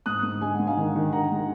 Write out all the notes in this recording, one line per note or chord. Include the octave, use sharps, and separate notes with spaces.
G#2 D#6 F#6
G#2
G#3 G#5
G#2 F#5
F5 G#5
D#3
D#3
D#3 F#5 A#5
G#3